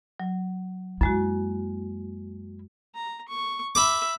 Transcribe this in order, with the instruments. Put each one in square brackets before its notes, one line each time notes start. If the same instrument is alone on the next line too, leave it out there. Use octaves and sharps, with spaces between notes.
[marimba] F#3
[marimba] F#2 G#3 F#4 [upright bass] A#3 E4
[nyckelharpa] A#5
C#6
[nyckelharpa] E5 [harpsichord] B5 D6